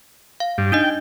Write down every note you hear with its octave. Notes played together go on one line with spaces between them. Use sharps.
F5
G2
D4 D#4 D#5 G5